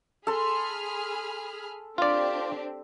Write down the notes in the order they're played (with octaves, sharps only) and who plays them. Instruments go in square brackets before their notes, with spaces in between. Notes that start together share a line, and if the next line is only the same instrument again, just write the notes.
[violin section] G#4 B5 F6 [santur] A4 C6
[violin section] C4 D4 G4 [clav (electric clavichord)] F4 D5